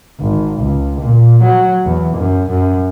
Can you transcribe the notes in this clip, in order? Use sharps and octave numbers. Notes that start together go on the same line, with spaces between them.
G#1
C#2
A#2
F#3
E2
F#2
F#2